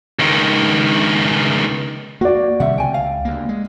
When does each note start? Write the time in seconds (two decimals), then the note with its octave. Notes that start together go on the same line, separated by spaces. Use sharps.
0.19 C#2 D#3
2.21 A#3 F#4 D5
2.60 C3 D#3 G3 E5 F#5
2.78 C#2 G5 G#5
2.94 F5
3.25 D2 A#3
3.49 G#3